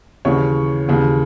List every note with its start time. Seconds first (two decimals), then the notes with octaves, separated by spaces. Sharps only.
0.25 D#2 C#3 E3 C#5
0.88 D#2 C#3 E3